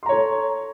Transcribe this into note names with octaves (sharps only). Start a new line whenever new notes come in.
A4 C#5 A#5 C6